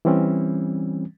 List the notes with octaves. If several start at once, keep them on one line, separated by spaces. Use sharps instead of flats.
E3 G3 C4 C#4